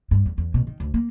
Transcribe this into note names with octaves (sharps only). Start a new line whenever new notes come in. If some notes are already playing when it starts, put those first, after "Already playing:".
G2
E2
E2
B2
D#3
D2
A#3